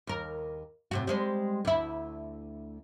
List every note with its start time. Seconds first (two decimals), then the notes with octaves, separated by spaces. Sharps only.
0.07 D#2 A#4
0.91 A2 C3 F#4
1.07 G3 G#3 C5
1.65 D2 E4